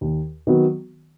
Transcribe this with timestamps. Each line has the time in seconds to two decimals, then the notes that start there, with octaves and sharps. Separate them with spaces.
0.01 D#2
0.47 D#3 F#3 B3 F#4